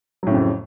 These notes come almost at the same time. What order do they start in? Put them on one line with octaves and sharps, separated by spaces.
F#3 A2 C#3 F2